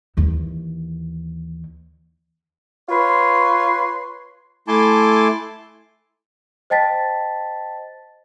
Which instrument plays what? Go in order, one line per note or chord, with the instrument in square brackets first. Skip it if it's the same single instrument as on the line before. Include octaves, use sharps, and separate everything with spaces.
[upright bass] D#2 E3
[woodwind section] F4 B4 C#5 C6
[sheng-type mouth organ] A3 E4 G#5 A5 C6 D6
[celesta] C5 D#5 G5 A5 A6 B6